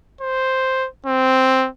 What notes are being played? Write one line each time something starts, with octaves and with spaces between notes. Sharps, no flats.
C5
C4